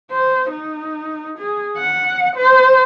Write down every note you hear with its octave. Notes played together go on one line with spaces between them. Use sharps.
C5
D#4
G#4
F#5
C5